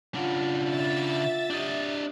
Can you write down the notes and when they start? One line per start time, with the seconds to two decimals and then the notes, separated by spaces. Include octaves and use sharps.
0.15 C#3 D4 F4 F5 F#5
0.69 E5 A6
1.50 D4 G4 D#5